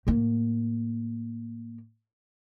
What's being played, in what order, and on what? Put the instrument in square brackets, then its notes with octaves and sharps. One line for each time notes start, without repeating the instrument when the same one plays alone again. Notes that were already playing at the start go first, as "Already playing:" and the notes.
[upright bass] A2 A#3